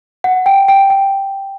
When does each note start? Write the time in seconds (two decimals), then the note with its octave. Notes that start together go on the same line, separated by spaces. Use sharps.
0.24 F#5
0.46 G5
0.68 G5
0.90 G5